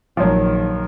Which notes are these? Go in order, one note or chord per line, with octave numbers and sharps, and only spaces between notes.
A#1 D#3 F3 F#3